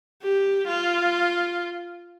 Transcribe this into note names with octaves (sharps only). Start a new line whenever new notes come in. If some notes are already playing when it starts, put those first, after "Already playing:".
G4
F4